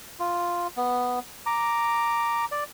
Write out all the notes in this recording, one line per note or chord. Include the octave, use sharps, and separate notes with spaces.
F4
B3
A#5 D6
D5